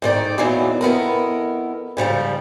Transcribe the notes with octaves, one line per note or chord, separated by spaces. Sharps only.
G#2 D#3 D5
E2 A#2 D#3 E3 F#3
F2 B3 E4 A#4
G#2 C#3 F3 G3